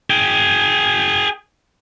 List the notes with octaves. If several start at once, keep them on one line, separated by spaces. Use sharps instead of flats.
G#4 G5